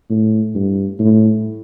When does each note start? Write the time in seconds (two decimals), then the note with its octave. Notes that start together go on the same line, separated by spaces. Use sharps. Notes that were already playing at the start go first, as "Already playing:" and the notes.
0.10 A2
0.55 G2
0.99 A2